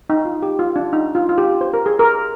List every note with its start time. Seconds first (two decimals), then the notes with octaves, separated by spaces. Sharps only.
0.10 D#4
0.25 F4
0.43 G4
0.59 F4
0.76 D4
0.93 D#4
1.15 F4
1.29 F4
1.38 G4
1.61 C5
1.74 A#4
1.86 G#4
1.99 A#4